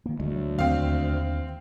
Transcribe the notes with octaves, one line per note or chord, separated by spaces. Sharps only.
D#3 A#3
D2 G#3
F#3
D#2 C4 F5